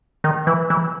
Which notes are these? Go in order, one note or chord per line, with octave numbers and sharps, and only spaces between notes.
D#3
E3
E3